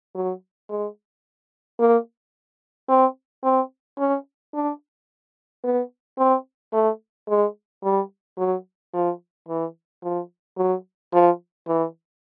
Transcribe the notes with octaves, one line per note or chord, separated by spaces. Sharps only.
F#3
G#3
A#3
C4
C4
C#4
D4
B3
C4
A3
G#3
G3
F#3
F3
E3
F3
F#3
F3
E3